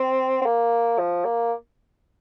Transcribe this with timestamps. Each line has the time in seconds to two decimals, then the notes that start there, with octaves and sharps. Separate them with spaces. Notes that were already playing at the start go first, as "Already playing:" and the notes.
Already playing: C4
0.42 C4
0.46 A#3
0.99 F3
1.25 A#3